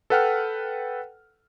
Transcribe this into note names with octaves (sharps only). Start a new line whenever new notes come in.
A4 B4 F#5 G5 F6